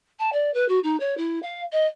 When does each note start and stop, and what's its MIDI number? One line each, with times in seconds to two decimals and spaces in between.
0.19 0.30 81
0.32 0.52 74
0.54 0.67 71
0.68 0.79 66
0.83 0.98 63
1.00 1.17 73
1.17 1.39 64
1.42 1.61 77
1.72 1.86 75